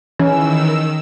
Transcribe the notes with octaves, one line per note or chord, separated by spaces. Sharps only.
D#3 E3 C#4 E6